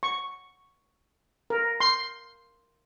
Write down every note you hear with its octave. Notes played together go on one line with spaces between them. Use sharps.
C#6
A#4
C6